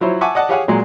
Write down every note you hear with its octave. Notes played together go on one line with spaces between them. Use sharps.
F3 F#3 E4 C5 C#5
E5 F#5 G#5 A5 C#6 D6
D5 D#5 F#5 A5
G4 G#4 C#5 F5 F#5 G#5
A#2 F#3 G#3